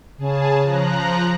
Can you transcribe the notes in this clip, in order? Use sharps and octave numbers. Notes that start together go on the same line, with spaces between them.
C#3 G#4 A5
F3 A#5 F#6